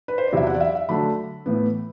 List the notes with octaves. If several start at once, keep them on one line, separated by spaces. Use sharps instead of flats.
B4
C5
D5
E2 C3 F#3 C4 E4 E5
F#5
D5
E5
E5
D3 F#3 A3 D4 B5
A2 E3 B3